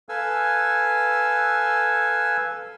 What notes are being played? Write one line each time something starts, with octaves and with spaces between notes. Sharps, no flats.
A4 B4 F5 G#5 E6